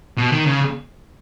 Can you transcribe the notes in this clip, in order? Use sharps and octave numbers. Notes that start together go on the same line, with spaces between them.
B2
D#3
C#3